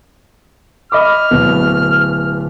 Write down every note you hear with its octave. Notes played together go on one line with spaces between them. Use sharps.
D#5 B5 D6 F6
D1 B2 B4